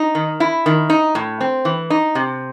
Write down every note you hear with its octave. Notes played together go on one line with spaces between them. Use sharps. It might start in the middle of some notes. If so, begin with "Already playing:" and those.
Already playing: D#4
D#3
E4
D#3
D#4
A2
C4
E3
D#4
C3